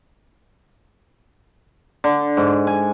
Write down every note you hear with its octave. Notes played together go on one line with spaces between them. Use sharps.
D3
G#2
G#5